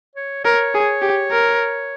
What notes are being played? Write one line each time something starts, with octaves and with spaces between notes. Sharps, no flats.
C#5
A#4 C#5
G#4
G4
A#4